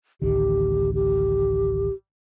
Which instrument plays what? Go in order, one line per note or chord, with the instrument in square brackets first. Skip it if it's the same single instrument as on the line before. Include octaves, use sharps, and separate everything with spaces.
[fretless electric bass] A1 D2 D#3 [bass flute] G4
[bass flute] G4